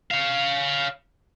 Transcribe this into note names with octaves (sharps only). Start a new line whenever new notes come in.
C#5 F5